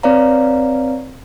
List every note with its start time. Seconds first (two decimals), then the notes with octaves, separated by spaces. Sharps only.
0.03 C4 B4 C#5 D5 F5 A#5